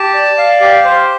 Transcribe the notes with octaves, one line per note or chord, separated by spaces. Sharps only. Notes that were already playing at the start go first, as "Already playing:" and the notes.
Already playing: G4 A5
D5
F5
G4
C5